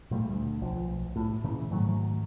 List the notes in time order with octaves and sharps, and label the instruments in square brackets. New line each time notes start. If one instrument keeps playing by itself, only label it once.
[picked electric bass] A#2 G3 A3
D2
B1 F3
A2
A#2 C#3 E3
G#2 D#3 F#3 A3